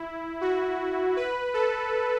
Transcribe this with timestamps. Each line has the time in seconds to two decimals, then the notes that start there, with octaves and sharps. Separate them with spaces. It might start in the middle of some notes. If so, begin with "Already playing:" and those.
Already playing: E4
0.41 F#4
1.17 B4
1.54 A4